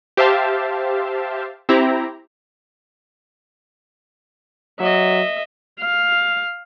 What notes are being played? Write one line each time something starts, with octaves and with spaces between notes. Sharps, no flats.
G4 C5 E5 F5 A5
C4 E4 G4 A#5
F#3 D#5 E5
F5